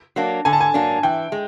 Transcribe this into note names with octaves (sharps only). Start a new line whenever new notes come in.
F#3 A#3 D4
D3 G#5
A5
G#5
F#3 A#3 D4
E3 G5
G#3